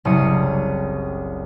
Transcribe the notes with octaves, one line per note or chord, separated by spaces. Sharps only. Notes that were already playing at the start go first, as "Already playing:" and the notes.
F#1 C2 C3 D#6 C7 C#7